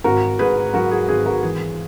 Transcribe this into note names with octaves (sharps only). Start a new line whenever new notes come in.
G#1 F#4 A#4
G#2 G#4 B4
F#3 F#4 A#4
G#4
G#1 G#4
F#4 A#4
E3 G#4